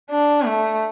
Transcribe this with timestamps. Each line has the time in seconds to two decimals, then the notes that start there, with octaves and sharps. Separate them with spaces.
0.11 D4
0.46 A3